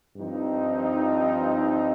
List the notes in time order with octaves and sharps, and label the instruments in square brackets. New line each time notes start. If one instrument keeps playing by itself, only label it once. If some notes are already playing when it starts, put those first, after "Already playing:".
[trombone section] G2 F3 C4 D#4